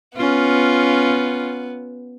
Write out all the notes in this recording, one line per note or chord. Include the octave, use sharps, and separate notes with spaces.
B3 C#4 F4